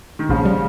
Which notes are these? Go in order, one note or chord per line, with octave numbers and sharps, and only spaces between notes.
D#3
A#1 C#3 F3
G3